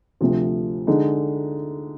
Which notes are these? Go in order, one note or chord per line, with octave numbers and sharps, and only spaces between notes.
D2 C3 F3
D3 G#3 D#4